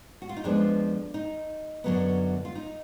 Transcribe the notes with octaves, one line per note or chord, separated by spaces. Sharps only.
F#4
F4
D#4
F2 F3 G#3 B3 D4
D#4
F#2 D3 F#3 B3
F4
D#4